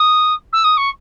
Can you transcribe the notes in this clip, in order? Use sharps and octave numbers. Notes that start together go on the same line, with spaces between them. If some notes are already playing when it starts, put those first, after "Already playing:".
Already playing: D#6
E6
D#6
C#6